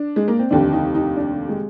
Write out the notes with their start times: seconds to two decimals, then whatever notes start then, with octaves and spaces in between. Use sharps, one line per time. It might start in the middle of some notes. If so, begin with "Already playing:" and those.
Already playing: D4
0.16 G#3
0.28 A#3
0.39 C4
0.51 F1 D#2 D3 D4
0.73 D#4
0.95 D#4
1.17 D4
1.49 G#3